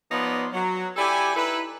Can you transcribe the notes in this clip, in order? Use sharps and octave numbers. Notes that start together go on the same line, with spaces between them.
F3 B3 D#4 C#5 D5 C6
F#3
E4 G4 A4 D5 G#5
D#4 E4 A4 B4